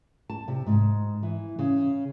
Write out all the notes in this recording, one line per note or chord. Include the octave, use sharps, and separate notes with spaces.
A5
C3
G#2
E3
C#3